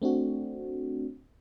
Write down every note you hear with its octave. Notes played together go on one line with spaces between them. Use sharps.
A3 C4 D4 F#4